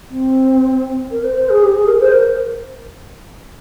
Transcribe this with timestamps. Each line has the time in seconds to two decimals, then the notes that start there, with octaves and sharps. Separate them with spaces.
0.10 C4
1.11 A#4
1.24 C5
1.37 C5
1.49 G#4
1.63 G4
1.75 G#4
1.87 A#4
2.00 C5
2.12 A#4